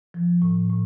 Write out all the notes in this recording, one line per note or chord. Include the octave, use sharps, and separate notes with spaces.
F3
A2
A2